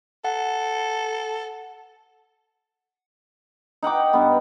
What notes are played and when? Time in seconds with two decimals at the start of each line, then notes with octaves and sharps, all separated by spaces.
0.25 A4 F#5
3.82 D#4 F#5 G5 D6
4.13 G2 B3